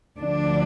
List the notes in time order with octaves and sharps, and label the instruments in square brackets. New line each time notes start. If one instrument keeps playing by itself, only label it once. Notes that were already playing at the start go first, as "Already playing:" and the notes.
[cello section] D2 D3 F3 D4